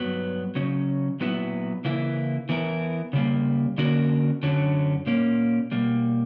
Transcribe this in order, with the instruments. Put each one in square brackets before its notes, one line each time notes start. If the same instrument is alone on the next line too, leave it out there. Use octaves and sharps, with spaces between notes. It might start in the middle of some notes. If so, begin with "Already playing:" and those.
Already playing: [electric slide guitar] G2 F#3 B3
C#3 F#3 C#4
A#2 F#3 B3 E4
C#3 E3 A#3 E4
E3 B3 E4 A#4
C#3 G3 A#3
D3 A#3 C#4 F#4 A#4
F#2 D3 F#3 C#4
A#2 A#3 C#4
B2 G3 A#3